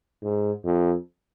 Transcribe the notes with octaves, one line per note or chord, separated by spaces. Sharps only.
G#2
F2